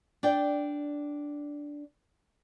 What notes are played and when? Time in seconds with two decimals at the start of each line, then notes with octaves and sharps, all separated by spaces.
0.23 D4 D5 G5